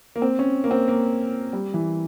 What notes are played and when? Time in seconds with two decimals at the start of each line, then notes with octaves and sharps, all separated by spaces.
0.16 A#3
0.22 C4
0.39 C#4
0.64 A#3
0.71 C4
0.88 A#3
1.53 G3
1.74 E3